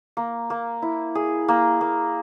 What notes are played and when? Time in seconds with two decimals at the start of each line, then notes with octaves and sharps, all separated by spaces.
0.17 A#3
0.50 A#3
0.82 E4
1.15 G#4
1.48 A#3
1.81 A#3